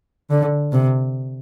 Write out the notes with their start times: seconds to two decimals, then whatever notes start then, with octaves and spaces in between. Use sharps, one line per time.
0.31 D3
0.72 C3